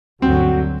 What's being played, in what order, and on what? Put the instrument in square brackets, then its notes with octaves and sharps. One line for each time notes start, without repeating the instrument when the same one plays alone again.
[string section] D2 G2 F#3 [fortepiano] C4 [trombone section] F#4